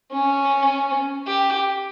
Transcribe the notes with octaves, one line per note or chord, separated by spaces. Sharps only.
C#4
G4